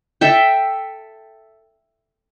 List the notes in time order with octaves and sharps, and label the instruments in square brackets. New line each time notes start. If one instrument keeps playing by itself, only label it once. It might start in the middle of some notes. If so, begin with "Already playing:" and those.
[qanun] A4 E5 G5